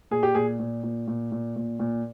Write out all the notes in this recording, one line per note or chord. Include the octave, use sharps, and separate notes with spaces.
A#2 G#4
G4
A#2 G#4
A#2
A#2
A#2
A#2
A#2
A#2